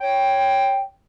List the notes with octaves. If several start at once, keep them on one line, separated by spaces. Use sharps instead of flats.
C#5 G5